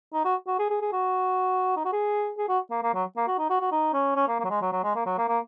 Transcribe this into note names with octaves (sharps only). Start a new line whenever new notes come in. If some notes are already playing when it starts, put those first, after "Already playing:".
D#4
F#4
F#4
G#4
G#4
G#4
F#4
D#4
F#4
G#4
G#4
F#4
A#3
A#3
F#3
A#3
F#4
D#4
F#4
F#4
D#4
C#4
C#4
A#3
A#3
F#3
G#3
F#3
F#3
G#3
A#3
F#3
A#3
A#3